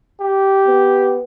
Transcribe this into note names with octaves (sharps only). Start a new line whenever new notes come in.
G4
B3